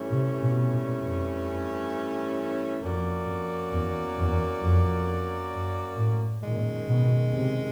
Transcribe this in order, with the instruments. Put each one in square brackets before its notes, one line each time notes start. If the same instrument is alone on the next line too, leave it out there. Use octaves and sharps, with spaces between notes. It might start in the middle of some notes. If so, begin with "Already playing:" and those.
Already playing: [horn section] G2 E3 A3 C#4
[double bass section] C3
B2
A#2
F2
[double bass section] F2 [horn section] A#3 C#4 F#4 A#4 D5
[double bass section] F2
E2
E2
F2
F#2
A2
[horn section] F#2 D#3 G#3 [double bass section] A#2
[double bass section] B2
C3